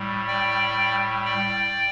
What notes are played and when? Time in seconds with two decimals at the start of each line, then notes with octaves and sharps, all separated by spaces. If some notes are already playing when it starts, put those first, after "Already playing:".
Already playing: A2 G3
0.27 D5 G5
1.25 D5 G5